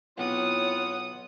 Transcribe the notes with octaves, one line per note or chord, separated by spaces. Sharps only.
B1 C4 E4 F4 C#5 F#5 D#6